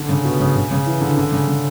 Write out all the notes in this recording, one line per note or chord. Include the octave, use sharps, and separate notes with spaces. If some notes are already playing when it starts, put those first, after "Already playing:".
Already playing: D3
C#3
B2
C#3
C#3
C#3
E3
D3
D3
C#3
C#3